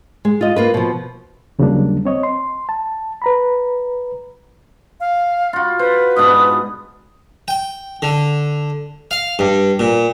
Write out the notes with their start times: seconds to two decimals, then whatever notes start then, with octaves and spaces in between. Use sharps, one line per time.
0.25 G#3
0.41 F4 D#5
0.56 A#3 F4 B4
0.74 B2 F3
1.59 D#2 C#3 F#3 G3 A#3 D4
2.05 C4 C#5 D#5
2.23 C6
2.69 A5
3.22 B4 A#5 B5
5.00 F5
5.53 F4 F#4
5.79 B4 C5
6.16 G#2 B2 D4 D#6
7.48 G5
8.02 D3
9.11 F5
9.39 G2
9.79 A#2